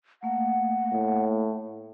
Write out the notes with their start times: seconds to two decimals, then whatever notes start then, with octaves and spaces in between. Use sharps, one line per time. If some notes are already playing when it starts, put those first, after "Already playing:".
0.23 A3 A#3 F5 F#5
0.93 A2